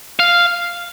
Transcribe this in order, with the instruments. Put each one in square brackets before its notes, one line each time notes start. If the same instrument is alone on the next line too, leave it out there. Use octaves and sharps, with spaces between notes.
[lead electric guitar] F5